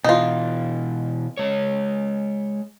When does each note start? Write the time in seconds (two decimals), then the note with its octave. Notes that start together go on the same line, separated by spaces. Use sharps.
0.04 B2 E3 D#4 F4
1.37 G#3 C#5